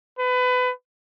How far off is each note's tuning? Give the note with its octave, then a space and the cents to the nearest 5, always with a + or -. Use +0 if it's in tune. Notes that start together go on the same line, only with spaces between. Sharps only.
B4 +25